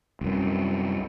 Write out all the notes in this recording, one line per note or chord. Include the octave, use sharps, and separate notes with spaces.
C2 F#2